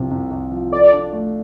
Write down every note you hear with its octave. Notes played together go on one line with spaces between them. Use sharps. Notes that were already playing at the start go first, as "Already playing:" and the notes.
Already playing: C2 C3 F3
C2
C2
F3
A4 D5
D4
A3